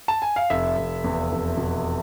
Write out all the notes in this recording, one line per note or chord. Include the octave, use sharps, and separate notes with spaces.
A5
G#5
F5
F1 E5
F1
E2
F1
B2